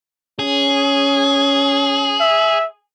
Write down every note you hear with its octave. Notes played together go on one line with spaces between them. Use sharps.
C#4 G#4
E5